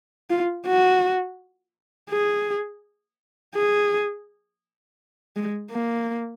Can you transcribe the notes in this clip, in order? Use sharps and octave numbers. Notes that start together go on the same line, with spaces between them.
F4
F#4
G#4
G#4
G#3
A#3